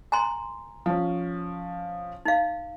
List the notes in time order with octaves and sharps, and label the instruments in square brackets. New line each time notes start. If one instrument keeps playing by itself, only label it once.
[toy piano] G#5 A#5 C6
[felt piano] F3 C#4
[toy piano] D#4 F5